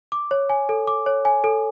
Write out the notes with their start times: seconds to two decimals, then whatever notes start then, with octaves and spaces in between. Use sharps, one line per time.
0.12 D6
0.31 C#5
0.50 G#5
0.69 A4
0.87 D6
1.06 C#5
1.25 G#5
1.44 A4